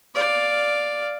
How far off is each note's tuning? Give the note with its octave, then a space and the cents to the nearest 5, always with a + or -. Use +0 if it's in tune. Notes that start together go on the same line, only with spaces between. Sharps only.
D5 +0 F5 +5